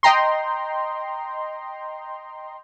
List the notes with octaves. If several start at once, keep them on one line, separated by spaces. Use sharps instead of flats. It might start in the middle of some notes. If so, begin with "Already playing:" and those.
D#5 G5 A#5 C6